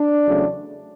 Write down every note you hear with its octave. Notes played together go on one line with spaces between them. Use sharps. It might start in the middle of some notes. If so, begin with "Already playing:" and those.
Already playing: D4
E2 C#3 F#3 A3